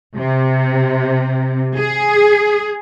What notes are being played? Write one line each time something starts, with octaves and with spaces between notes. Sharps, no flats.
C3
G#4